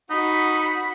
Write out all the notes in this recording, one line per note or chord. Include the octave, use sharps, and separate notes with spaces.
D#4 F#4 B5